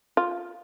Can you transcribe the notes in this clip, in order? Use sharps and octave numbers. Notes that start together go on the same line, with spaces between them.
F4